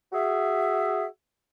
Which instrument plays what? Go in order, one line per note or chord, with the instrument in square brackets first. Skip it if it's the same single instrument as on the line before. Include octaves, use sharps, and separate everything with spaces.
[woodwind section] F#4 G#4 E5